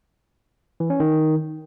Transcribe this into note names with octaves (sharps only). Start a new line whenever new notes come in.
E3
C#4
D#3